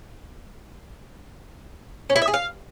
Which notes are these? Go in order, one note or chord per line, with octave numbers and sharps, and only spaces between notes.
C#4
E4
E5
G#4
F5